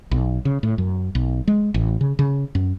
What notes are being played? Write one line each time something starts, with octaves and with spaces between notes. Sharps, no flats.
B1
C#3
A2
F#2
B1
G#3
A1
C#3
C#3
F#2